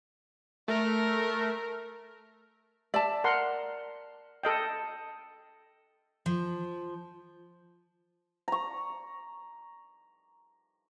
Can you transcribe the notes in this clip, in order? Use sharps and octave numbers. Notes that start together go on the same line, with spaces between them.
A3 A#4
D5 E5 A5
A#4 F#5 C6
A4 D#5 G5
F3
A#5 C#6